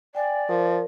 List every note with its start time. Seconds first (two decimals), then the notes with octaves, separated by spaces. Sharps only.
0.15 D5 G5 G#5
0.49 F3 A#4